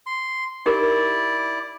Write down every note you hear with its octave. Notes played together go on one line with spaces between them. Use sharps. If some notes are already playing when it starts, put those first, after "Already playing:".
C6
D#4 E4 G4 A#4 D5